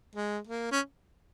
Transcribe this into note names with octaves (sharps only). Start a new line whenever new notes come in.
G#3
A#3
C#4